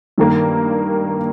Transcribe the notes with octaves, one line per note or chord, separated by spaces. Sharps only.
G2 D#3 A#3